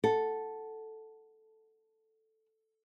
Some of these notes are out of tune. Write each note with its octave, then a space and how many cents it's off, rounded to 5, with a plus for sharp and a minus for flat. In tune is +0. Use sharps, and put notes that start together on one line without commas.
A4 +0 F#5 +0